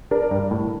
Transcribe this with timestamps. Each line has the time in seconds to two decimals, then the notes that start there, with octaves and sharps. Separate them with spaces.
0.11 D4 A#4 D5
0.31 G2
0.51 A2